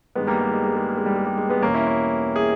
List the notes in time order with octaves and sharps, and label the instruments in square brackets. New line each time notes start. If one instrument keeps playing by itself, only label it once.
[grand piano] G2 D#3 G3 G#3 B3
G3 A#3
G3
G#3
G#3
G#3
A#3
G#3
G3
G#3
G3
G#3
G#3 B3
E2 B2 G3 A#3 C#4
C#4 E4
C#4 E4
E4 G#4